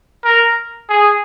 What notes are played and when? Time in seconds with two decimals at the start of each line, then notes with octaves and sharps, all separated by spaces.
0.24 A#4
0.89 G#4